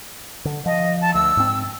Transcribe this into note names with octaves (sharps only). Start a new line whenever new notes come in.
D3
F3 D#5
A5
D2 E6
G#2 C4